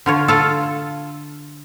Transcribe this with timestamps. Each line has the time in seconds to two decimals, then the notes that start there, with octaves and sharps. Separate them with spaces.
0.06 D3 F4 C#5
0.28 F4 A4